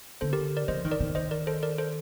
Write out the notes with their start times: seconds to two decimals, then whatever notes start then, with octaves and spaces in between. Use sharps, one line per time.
0.21 D3 A4 C5
0.33 G4 A#4
0.57 A#4 D5
0.68 F3 C5 D#5
0.85 D#3
0.91 A#4 D5
1.00 D#3
1.15 C5 D#5
1.31 A#4 D5
1.47 A4 C5
1.63 A#4 D5
1.78 A4 C5